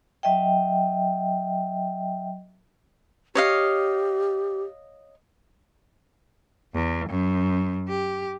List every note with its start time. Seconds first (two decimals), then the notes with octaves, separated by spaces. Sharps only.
0.23 F#3 D#5 E5 G5
3.35 G4 C#5 D#5 F5
6.74 E2
7.09 F#2
7.88 G4